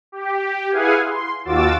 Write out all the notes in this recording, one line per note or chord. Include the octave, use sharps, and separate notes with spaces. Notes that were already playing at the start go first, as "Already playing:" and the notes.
G4
E4 G#4 B4 F5 F#5 G#5
C6
D#2 F4 F#4 D6 E6 A6